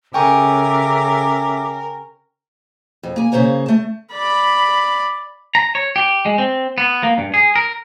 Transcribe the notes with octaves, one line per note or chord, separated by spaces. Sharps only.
C#3 A4 A#4 E5 G5 G#5 C#6 D6
F2
A#3 G#5
C#3 A#3 C5 C#5 A#5
A3 A5
D5 B5
A#5
C#5
G4
G#3
C4
B3
A#3
G2
G#4
A#4